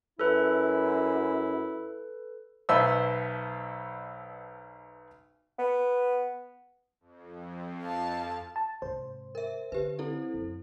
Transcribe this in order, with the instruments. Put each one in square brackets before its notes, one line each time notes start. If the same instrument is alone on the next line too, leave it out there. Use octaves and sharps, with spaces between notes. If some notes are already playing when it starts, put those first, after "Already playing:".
[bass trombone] F#2 [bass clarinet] E4 [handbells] A4 B4
[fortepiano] B1 B2 B4 C5 E5 E6
[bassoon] B3
[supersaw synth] F2
[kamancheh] F5 A5
[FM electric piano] A5
[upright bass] G#2 C3 [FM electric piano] C5
[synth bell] A#4 E5
[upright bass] D3 [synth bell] G4 B4
[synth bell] C4 E4 A4
[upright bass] F#2